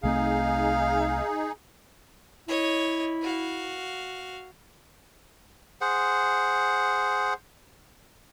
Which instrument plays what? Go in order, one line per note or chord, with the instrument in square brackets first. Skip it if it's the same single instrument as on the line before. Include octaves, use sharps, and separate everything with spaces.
[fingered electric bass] C2 A3 C4 [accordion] D#4 G#4 [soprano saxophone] F5
[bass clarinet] E4 [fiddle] C#5 D#5
[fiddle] F#4 F5
[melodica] G#4 C5 F#5